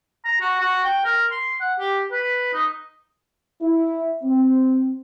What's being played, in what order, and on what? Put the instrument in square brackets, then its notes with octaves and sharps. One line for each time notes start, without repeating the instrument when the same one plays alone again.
[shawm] A#5
F#4
F#4
G5
A#4
C6
F#5
G4
B4
D#4
[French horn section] E4
C4